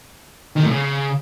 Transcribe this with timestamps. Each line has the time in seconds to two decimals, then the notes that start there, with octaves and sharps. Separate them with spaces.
0.56 D#3
0.63 A2
0.70 C#3